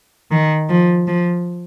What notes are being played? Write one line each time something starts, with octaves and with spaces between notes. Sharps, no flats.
D#3
F3
F3